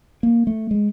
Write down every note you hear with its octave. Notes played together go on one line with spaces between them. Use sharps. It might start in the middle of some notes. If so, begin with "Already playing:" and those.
A#3
A3
G#3